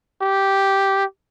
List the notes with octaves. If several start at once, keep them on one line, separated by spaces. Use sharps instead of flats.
G4